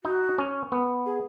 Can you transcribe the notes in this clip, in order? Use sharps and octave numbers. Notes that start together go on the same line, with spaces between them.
D#4 F#4
C#4
B3
G#4